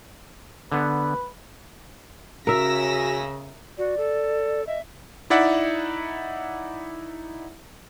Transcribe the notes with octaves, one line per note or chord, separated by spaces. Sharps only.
D3 B3 B4
C#3 F#4 A#4 E5 E6 A#6 B6
F#4 D5
A4
D#5 E5
D#4 E4 D5 E5 F#5